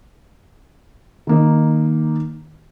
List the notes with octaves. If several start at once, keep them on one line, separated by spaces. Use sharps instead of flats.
D#3 A#3 D#4